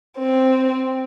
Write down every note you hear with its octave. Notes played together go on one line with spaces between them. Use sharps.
C4